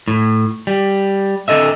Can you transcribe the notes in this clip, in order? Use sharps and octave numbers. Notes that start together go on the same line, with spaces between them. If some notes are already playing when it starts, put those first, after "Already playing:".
A2
G3
D3 A4 D#5 E5